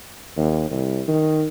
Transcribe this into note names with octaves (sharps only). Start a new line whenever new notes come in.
D#2
C2
D#3